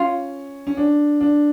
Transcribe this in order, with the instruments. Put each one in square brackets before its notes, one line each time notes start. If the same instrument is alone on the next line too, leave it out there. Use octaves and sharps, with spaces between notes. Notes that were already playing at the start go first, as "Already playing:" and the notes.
Already playing: [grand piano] C#4 [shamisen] F4
[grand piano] C#4
D4
D4